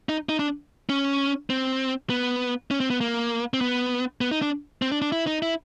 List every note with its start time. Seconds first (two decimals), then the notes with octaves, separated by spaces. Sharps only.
0.09 D#4
0.29 D#4
0.39 D4
0.89 C#4
1.50 C4
2.10 B3
2.71 C#4
2.80 C4
2.90 B3
3.01 A#3
3.54 C4
3.61 B3
4.21 B3
4.31 D#4
4.42 D4
4.82 C4
4.92 D4
5.02 D4
5.12 E4
5.27 D#4
5.42 E4